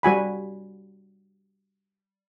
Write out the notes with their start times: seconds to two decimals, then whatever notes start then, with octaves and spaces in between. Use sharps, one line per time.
0.03 G3 F#4 G#5 B5